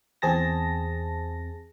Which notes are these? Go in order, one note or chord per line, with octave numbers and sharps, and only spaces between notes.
E2 C4 G#4 A5 A#6